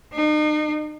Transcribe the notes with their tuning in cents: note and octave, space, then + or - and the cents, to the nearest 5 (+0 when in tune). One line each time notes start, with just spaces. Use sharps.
D#4 -40